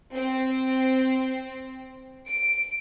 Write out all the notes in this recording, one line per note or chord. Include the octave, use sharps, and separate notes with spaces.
C4
D7